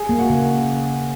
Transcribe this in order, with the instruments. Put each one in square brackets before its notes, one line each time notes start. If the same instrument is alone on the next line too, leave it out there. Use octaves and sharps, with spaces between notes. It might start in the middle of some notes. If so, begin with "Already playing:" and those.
Already playing: [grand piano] G#4 G#5
[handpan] A#3
[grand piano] F#4 F#5
[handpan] C#3